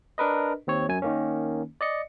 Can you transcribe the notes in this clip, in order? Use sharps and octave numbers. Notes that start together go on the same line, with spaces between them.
D4 A#4 B4 D#5
D#2 C4 C#5
F#2 G#5
D#3 A#3 C#4
D5 D#5 C#7